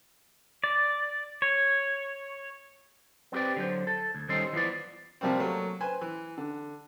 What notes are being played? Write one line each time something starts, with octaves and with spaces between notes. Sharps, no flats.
D5
C#5
B3 C4 G4 B4 D5
D3 F#3 C5
A4
D2
D#3 G3 C#4 D#4 A4 C5
E3 F3 B3 B4 D5
C3 F3 G3 A#3 C4
F#3 A3 A#3
B4 C5 G#5
E3
D3